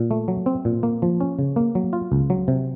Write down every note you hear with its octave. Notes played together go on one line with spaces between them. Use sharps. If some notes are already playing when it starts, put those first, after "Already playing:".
Already playing: A#2
A3
F#3
C4
A#2
A#3
F3
C#4
C#3
A#3
F#3
F4
C#2
F#3
C3